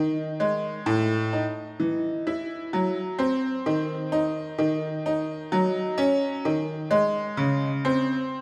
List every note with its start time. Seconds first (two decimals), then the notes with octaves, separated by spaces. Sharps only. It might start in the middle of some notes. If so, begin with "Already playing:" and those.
Already playing: D#3 D#4
0.40 G#3
0.86 A2
1.33 D#4
1.80 E3
2.27 E4
2.73 F#3
3.19 C4
3.66 D#3
4.12 D#4
4.58 D#3
5.06 D#4
5.52 F#3
5.98 C#4
6.45 D#3
6.91 G#3
7.37 C#3
7.85 C4